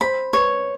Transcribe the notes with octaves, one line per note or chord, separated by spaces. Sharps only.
C5 B5
B4 C#5